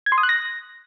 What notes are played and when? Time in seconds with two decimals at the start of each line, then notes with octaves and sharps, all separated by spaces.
0.06 G#6
0.12 C6
0.18 D#6
0.23 F#6
0.29 A#6